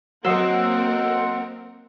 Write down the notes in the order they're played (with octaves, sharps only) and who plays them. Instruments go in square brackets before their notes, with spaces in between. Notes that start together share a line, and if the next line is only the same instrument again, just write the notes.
[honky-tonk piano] F#3 [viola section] A#3 C4 A#4 [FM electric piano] D#5 C6 E6 [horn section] F#5